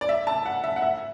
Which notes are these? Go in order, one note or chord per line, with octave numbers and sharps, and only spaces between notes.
D5
E5
A5
F#5
E5
F#5
E5